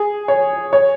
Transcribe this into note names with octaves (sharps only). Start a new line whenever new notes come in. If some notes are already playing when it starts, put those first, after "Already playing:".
Already playing: G#4
C#5
C#5